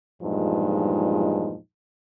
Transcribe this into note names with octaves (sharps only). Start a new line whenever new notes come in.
E2 G2 A#2 F3 G#3 D#4